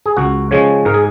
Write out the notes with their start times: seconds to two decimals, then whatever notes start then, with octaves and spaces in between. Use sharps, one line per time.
0.06 G#4
0.17 C#2 F#4
0.51 C#3 F3 G#3 C#5
0.85 G#2 A#4
0.94 G#4